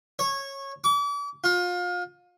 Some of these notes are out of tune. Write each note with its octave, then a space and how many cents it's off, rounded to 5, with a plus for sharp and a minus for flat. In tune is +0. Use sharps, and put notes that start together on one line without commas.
C#5 -15
D6 -40
F4 +30